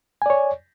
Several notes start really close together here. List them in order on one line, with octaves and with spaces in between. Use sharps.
G#5 D5 C#5